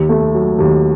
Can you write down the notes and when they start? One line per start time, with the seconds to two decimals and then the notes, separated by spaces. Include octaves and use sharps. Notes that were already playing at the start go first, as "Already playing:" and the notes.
Already playing: D#2
0.09 A3
0.34 F#3
0.59 D#2